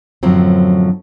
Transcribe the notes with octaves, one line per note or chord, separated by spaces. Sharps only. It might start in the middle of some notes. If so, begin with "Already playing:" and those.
F#2 A2 D3 F3 F#3 C4